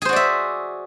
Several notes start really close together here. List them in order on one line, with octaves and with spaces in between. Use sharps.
G#4 C5 F#4 D5 E5